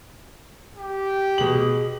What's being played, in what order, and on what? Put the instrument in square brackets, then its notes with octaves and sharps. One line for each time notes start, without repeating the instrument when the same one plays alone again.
[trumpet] G4
[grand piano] B2 F#7 [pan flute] G#4